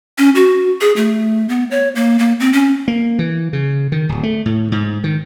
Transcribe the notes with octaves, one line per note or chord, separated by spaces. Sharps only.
C#4
F#4
G#4
A3
B3
C#5
A#3
A#3
C4
C#4
A#3
E3
C#3
D#3
D1
A3
A2
G#2
D#3